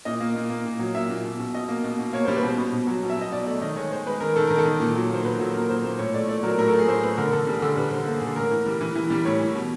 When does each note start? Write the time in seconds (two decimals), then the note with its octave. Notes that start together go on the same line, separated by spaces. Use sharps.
0.05 A#2 D#5
0.20 A#3
0.36 A#2
0.50 A#3
0.65 A#2
0.79 F#3
0.95 A#2 E5
1.10 A#2
1.24 B2
1.40 B2
1.54 B2 D#5
1.68 A#3
1.84 B2
1.99 B2
2.13 A#3 C#5
2.25 G3 C5
2.36 B4
2.43 B2
2.48 C5
2.58 B2
2.72 B2
2.87 F#3
3.03 B2
3.10 E5
3.17 B2 D#5
3.31 B2 D5
3.46 A3 D5
3.61 D#3 D#5
3.76 G#3 C#5
3.91 G#3 C5
4.06 G#3 B4
4.20 D#3 A#4
4.36 D#3 A4
4.47 D#3 A#4
4.58 A4
4.65 D#3
4.80 A#2
4.95 F#3
5.10 A#3 C5
5.25 F#3 B4
5.40 F#3 A4
5.54 A#2 A#4
5.70 A#2 C5
5.85 A#2 C5
5.99 A2 C#5
6.14 A3 D5
6.28 A3 D5
6.43 F#3 A#4
6.58 A2 A#4
6.68 A4
6.73 A3
6.79 G#4
6.88 A2 C5
7.03 A2 B4
7.18 D3 A#4
7.32 D3 A4
7.47 G3 G#4
7.62 D3 A4
7.76 G3 B4
7.91 G3 C5
8.06 A#3 A4
8.17 G#4
8.22 D3 A4
8.36 A2 A#4
8.51 E3
8.66 G3
8.81 E3
8.95 E3
9.10 G3
9.25 A2 C#5
9.39 E3
9.55 B2